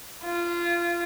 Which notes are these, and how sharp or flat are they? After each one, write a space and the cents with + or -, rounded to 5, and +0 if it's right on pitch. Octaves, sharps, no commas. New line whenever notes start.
F4 -20